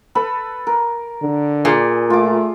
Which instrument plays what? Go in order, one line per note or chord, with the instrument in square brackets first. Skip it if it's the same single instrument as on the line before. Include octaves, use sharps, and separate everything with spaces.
[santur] A4 B4 B5
A#4
[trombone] D3
[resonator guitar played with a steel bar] A#2 [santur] G#4 D5
[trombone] A3 [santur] F4 D6